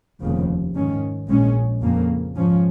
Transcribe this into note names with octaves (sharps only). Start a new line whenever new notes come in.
F1 D#2 C#3 F3
G#2 D#3 C#4
A#1 A#2 G#3 C#4
F2 C#3 A#3
G#2 F3 C#4